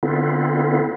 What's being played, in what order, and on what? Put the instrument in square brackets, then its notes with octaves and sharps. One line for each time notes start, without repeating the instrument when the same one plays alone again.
[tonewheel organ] D3 B3 C4 E4 F4